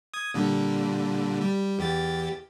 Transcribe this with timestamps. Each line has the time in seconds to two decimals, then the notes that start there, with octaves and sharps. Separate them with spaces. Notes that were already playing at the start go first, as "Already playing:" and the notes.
0.14 D#6 G#6
0.34 A#2 D3 G3
1.41 G3
1.79 E2 G4 A6